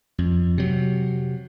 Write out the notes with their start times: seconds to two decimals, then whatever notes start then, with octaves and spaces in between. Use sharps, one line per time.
0.18 F2
0.58 C3 F#3